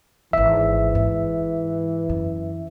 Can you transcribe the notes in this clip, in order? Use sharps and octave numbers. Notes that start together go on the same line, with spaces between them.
D1 G#1 E3 E5
G#2
F#2